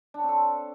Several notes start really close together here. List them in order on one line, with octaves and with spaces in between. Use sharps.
D4 C#5 C4 A4